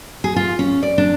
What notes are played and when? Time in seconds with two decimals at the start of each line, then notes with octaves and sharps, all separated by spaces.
0.24 G#4
0.36 F4
0.59 C#4
0.83 D5
0.98 D4